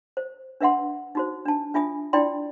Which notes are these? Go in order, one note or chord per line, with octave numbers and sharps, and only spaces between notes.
C5
D4 B4 E5 F#5 C6
D#4 F#4 C5
D4 A5
D4 F4 E5 G#5 D#6
D4 E4 F4 D5 G5 C6